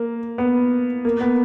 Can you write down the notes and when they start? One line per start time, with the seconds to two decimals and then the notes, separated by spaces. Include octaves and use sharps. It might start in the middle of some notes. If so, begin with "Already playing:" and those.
Already playing: A#3
0.38 B3
1.05 A#3
1.21 B3